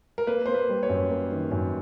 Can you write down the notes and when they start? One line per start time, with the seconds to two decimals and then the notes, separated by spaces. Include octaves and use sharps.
0.18 A#4
0.27 A#3 B4
0.46 A#3 C5
0.54 B4
0.69 G3
0.83 C#5
0.89 F#2
1.10 A#3
1.31 D#3
1.51 F#2